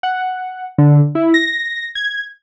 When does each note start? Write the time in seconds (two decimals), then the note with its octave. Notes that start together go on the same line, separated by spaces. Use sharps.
0.03 F#5
0.78 D3
1.15 E4
1.34 A#6
1.95 G#6